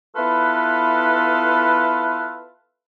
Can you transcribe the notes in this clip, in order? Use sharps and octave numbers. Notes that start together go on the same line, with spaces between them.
B3 E4 F4 A4 B4